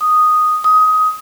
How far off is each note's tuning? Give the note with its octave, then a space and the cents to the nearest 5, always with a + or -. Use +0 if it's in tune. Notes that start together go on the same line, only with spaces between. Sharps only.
D#6 -5
D#6 +15